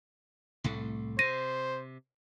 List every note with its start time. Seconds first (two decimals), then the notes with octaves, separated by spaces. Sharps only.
0.64 C2 A2 A3
1.19 C3 C5 A#6 D#7